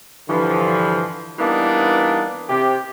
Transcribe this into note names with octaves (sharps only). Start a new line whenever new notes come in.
G2 D3 E3 F3
E3 G3 A#3 B3 D4 D#4
C3 G4